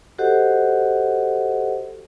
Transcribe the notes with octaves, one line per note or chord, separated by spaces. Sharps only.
F#4 G4 A4 C5 D#5 F#5